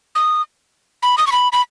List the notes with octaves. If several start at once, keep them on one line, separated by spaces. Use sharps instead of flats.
D#6
B5
D#6
C#6
B5
B5